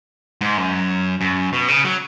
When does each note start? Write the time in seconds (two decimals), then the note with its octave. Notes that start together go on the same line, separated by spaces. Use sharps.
0.41 G#2
0.57 F#2
1.21 F#2
1.53 B2
1.68 C#3
1.85 F#3